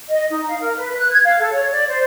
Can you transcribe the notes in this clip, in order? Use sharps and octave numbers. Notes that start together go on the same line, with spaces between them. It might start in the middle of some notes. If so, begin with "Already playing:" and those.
D#5
D#4
F5
A#4
B4
F#6
G#6
F5
A4
C#5
D5
C5